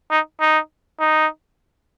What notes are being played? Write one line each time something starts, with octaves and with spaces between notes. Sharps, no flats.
D#4
D#4
D#4